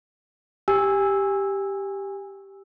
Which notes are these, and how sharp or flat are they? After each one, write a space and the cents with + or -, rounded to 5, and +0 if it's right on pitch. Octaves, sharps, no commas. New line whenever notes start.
G4 +0 G#5 -20 E6 -5